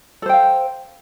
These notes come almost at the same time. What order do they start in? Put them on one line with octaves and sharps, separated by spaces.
A4 C5 G5 F5